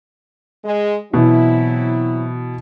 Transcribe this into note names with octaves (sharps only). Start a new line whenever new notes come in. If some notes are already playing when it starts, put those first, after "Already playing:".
G#3
B2 E3 F#3 C4 E4